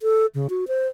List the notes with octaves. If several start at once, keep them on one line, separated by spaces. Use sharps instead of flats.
A4
C#3
F#4
C5